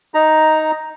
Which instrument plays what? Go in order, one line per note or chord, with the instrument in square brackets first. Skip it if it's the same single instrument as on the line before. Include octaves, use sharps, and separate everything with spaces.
[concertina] D#4 A#5